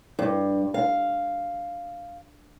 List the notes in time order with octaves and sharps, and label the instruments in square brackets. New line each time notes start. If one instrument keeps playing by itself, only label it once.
[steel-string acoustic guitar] G2
F5